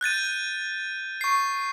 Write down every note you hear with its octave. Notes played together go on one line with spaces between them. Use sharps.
F#6 G6 A6 D#7
C#6 C7